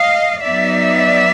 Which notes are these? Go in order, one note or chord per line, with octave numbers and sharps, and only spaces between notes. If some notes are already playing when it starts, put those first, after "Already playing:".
Already playing: D#5 F5
F#3 B3 D#4 D5 E5